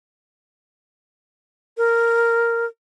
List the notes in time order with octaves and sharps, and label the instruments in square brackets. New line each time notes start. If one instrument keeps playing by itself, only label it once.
[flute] A#4